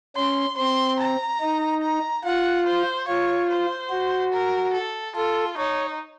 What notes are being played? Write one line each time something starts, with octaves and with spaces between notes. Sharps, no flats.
C#4 C6
C4 C6
A#5
D#4
A#5
F4 F#5
C5
F4 C#5
C5
F#4
A#4
A4
F4 A4
D#4 C#5